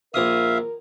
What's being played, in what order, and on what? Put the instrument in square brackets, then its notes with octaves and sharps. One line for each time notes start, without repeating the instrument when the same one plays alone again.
[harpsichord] A#1 D#6 [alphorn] A#4 [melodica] E5 F5